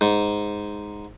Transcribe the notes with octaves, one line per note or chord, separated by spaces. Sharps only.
G#2